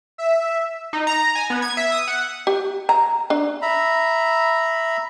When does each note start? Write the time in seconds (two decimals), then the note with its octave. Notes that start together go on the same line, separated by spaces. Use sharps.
0.18 E5
0.93 D#4
1.07 A#5
1.35 G#5
1.50 B3
1.62 G#6
1.77 E5
1.92 D#6
2.08 F#5
2.47 G4
2.89 A#5
3.30 D4
3.62 E5 A#5 B5